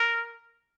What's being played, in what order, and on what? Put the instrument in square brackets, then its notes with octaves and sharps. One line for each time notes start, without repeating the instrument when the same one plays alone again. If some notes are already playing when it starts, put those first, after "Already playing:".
Already playing: [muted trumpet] A#4